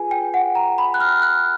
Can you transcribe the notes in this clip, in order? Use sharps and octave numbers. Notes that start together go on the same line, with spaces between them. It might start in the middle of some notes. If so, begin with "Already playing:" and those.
Already playing: F4 G#4 B4 G#5
G5
F#5
A#5
B5
F#6
F6
F#6